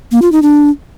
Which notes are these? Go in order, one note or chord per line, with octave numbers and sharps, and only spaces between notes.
A#3
F4
D#4
D4